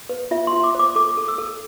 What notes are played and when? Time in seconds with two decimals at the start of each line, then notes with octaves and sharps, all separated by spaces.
0.09 B4
0.31 F4 E5
0.47 C6
0.53 F4
0.64 D6
0.75 C5 D6
0.96 A4 D6
1.17 A4
1.28 E6
1.38 A4